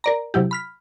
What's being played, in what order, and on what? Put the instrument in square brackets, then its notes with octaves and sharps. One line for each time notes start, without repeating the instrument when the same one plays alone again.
[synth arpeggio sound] A#4 D5 A#5
C3 F#3 E4 G4
B5 F6 B6